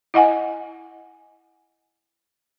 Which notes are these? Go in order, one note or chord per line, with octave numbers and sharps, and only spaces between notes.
E4 D#5 F#5 G#5